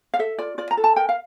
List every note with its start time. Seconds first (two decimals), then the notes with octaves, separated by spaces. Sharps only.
0.14 F5
0.19 A4 E5
0.38 F4 D5
0.58 F4 D5
0.71 A#5
0.77 A4
0.84 A5
0.96 A#4 G5
1.09 F5